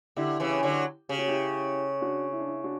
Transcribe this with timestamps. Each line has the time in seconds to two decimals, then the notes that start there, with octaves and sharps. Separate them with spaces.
0.16 D3 E4 G4
0.40 C#3 E3
0.63 D3 F#3
1.09 C#3 G4
1.18 F#4
1.28 E4 G4
2.01 D4 F#4
2.32 E4
2.40 D4
2.48 E4
2.64 D4 F#4